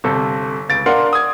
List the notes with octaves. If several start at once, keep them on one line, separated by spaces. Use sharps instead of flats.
G1 C3 A4
C#2 A6 D7
D4 A#4 F5 F#5 C6
D#6 G#6